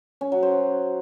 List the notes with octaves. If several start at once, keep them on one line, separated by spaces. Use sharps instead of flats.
C#4
F#3
C5